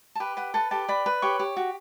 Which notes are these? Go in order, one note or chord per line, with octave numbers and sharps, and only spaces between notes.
A5
G4 B4 B5
B4 F#5
A4 B4 A5
G4 A4 A5
B4 D5 B5
B4
G4 C#5 C#6
G4
F#4